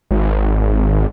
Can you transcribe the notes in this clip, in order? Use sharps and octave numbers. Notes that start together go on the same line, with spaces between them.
G#1